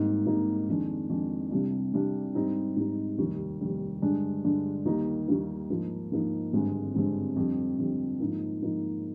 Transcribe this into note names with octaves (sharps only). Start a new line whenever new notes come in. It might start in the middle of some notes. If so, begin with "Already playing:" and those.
Already playing: G#1 G#2 G3 A#3 D#4
G#1 G#2 G3 A#3 D#4
F2 D#3 G#3 D4
F2 D#3 G#3 D4
C2 C3 G3 D4
C2 C3 G3 D4
G#2 G3 C4 D#4
G#2 G3 C4 D#4
F1 D#2 D#3 G3
F1 D#2 D#3 G3
G2 D3 G#3 D4
G2 D3 G#3 D4
D#2 D#3 G3 A#3 D#4
D#2 D#3 G3 A#3 D#4
G#2 F3 A#3 D#4
G#2 F3 A#3 D#4
G#1 G2 D3 G#3 C4
G#1 G2 D3 G#3 C4
F2 D3 G3 C4
F2 D3 G3 C4
G#2 F3 A#3 D#4
G#2 F3 A#3 D#4